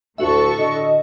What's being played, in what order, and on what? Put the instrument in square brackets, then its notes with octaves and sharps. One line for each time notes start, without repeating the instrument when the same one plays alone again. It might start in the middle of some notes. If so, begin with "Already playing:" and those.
[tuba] D2 [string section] A2 A4 C#6 [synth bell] F#4 E5
[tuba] D3 [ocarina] D#5